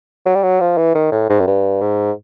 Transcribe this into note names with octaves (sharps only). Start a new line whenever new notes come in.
F#3
G3
F#3
F3
E3
D#3
A2
G#2
F#2
G2
G#2